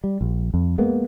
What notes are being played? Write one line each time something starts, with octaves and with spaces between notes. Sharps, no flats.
G3
A#1
F2
G#3 A#3 B3